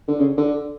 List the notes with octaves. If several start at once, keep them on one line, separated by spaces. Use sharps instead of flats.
D3
C#3
D3